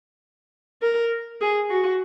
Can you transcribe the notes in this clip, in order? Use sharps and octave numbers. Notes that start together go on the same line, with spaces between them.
A#4
G#4
F#4